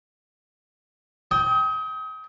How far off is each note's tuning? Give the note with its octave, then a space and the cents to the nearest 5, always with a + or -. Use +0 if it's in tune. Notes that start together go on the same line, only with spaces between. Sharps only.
G5 +0 D#6 +35